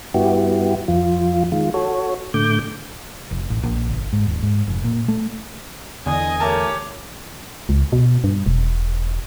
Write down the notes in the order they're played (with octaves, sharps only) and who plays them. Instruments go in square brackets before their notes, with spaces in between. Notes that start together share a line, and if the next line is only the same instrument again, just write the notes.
[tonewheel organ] G2 B3 E4 F#4 G4
F2 F3 F4
D#3 G#3 F4
F#4 A4 C#5
A2 D3 A3 D6 G6
[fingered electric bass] F1
A1
A#1
G1
G#2
D#1
G#2
F1
A#2
A3
[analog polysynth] E2 D3 [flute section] D#5 D#6 [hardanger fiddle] G#5
[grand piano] A3 A#4 A5 [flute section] G4 C#5 D6
[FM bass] C#2
B2
G2
E1